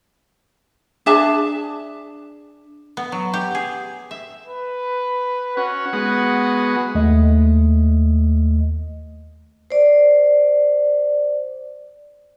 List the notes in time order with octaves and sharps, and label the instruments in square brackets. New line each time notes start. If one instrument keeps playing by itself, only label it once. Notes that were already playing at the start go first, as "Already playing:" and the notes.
[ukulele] D4 G#4 E5 A5
[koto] B3
F#3
G4
G#4
E5
[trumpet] B4
[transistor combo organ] C#4 F#4 [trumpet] F#5
[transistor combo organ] G#3 B3 F#4
[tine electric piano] D#2 A3 D#5
[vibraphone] C5 D5